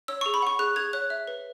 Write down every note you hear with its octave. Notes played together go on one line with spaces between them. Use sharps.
C#5 E6
G#4 C#6
B5
F#5 C#6
G#4 F#6
G#4 G#6
C#5 F#6
E5
B4